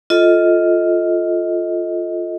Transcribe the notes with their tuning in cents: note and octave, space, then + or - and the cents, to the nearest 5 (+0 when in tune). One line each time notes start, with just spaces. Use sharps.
F4 +0 A4 -10 D#5 +20